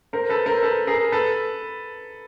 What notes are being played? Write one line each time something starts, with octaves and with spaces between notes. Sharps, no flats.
A#4 C5
A4 B4
A#4 C5
A4 B4
G#4 A#4
A4 B4